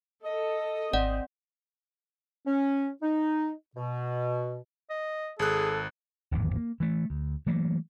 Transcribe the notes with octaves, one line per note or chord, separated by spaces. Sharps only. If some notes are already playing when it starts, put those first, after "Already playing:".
A4 D#5
G#1 C4 D5 F#5
C#4
D#4
B2
D#5
G#1 G#4 A4 F#6
D1 G#1 E2 D#3
A#3
E3 A3
D2
E3 F#3 A3 A#3